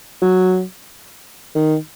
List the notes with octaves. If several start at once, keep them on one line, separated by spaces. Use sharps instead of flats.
F#3
D#3